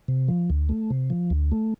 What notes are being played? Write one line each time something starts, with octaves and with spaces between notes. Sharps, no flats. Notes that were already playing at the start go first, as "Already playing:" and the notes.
C3
F3
D2
A3
C3
F3
D2
A3